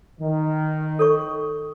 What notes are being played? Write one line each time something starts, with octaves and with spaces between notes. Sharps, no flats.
D#3
A4 C#5 C#6